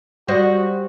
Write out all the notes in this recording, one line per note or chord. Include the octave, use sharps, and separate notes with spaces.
G3 F#4 C5 D#5